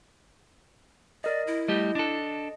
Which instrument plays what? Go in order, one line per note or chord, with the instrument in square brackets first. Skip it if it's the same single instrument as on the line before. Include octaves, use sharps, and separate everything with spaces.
[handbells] A#4 D#5 [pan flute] D5
[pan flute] E4
[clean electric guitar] G3 A3 G4 [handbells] D#5
[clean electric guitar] D4 A4